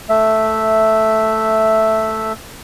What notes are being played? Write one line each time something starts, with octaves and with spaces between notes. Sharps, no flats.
A3 E5